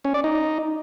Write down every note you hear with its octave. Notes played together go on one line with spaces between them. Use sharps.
C#4
D5
D#4